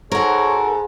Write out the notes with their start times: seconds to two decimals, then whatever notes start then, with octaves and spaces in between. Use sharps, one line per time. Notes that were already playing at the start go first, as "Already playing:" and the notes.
0.12 G#2 F#4 A4 A#4 C#5